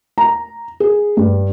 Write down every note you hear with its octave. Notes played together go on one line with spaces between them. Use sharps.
A#5
G#4
G2